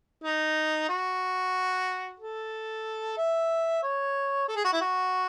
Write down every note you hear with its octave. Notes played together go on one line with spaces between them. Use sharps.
D#4
F#4
A4
E5
C#5
A4
G#4
F#4
E4
F#4